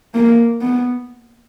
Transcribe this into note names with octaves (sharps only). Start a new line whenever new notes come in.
A#3
B3